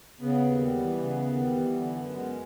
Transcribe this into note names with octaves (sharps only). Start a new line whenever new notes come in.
C#3 B3
D#2
G3
E3
C#3
D#2
G3
E3
D3
F#2
G#3